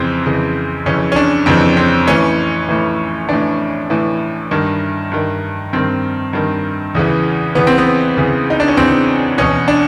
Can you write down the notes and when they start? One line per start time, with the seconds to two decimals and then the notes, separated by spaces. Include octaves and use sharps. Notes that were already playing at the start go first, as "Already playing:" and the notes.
Already playing: F2 C#3 E3 C4
0.25 F2 C#3 E3
0.86 F2 C#3 E3 C#4
1.12 C#4
1.16 D4
1.46 F2 C#3 E3 C4
1.77 C4
2.07 A2 E3 C#4
2.69 A2 E3
3.29 A2 E3 D4
3.90 A2 E3
4.51 G2 D#3
5.12 G2 D#3
5.73 G2 D#3 C4
6.33 G2 D#3
6.95 E2 C#3 E3
7.55 E2 C#3 E3 B3
7.67 C4
7.78 B3
8.17 E2 C#3 E3
8.50 D#4
8.60 D4
8.68 C#4
8.77 E2 C#3 E3 C4
9.38 E2 B2 C#4
9.68 D4